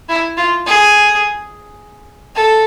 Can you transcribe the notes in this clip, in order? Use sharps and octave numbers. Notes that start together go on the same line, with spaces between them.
E4
F4
G#4
A4